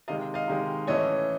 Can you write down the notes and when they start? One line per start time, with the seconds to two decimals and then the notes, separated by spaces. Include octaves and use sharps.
0.08 C3 D#3 G#3 D#5 F5
0.34 D#5 F5
0.48 C3 D#3 G#3
0.87 A2 E3 A3 C#4 C#5 D#5